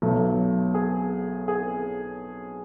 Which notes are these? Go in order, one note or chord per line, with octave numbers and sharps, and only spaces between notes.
B1 B2 F#3 A3
G#4
G#4